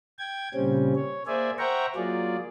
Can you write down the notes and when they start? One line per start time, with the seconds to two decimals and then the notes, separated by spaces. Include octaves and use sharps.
0.19 G5 G#6
0.54 A#2 C#3 G3 C4 C#4
0.96 C#5
1.27 A#3 G#4 C5 D5 E5 G#5
1.58 C5 E5 F#5 G5 A#5 C#6
1.96 F#3 A#3 F4 G#4 D5